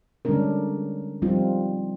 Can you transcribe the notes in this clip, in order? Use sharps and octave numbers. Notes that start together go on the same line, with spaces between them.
D3 G3 G#3 C#4 D4 A#4
F3 G3 C4 D#4 F4